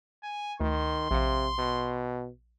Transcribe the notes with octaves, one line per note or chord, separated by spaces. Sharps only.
G#5
D2 D#3 C6
A#1 C3 F5
B2